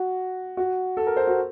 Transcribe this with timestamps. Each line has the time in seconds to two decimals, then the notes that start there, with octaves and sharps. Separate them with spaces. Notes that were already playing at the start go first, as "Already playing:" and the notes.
Already playing: F#4
0.57 F#4
0.97 A4
1.07 A#4
1.17 C5
1.27 F#4